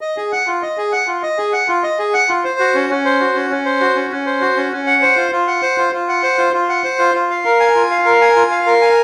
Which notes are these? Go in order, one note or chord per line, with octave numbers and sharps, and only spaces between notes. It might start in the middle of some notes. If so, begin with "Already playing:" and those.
D#5
G#4
F#5
F4
D#5
G#4
F#5
F4
D#5
G#4
F#5
F4
D#5
G#4
F#5
F4
C5
F#4
C#4
C#4
C5
F#4
C#4
C#4
C5
F#4
C#4
C#4
C5
F#4
C#4
C#4
F#5
C5
F4
F4
F#5
C5
F4
F4
F#5
C5
F4
F4
F#5
C5
F4
F4
F5
A#4
G#5
F4
F5
A#4
G#5
F4
F5
A#4
G#5